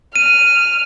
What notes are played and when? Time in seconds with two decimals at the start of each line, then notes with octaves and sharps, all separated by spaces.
0.16 F6 D#7